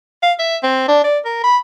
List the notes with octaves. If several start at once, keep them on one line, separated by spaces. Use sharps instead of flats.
F5
E5
C4
D4
D5
A#4
B5